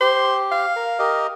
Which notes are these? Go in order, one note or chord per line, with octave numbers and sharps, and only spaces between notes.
G4 C5
F5
A#4
G4 A#4 D#5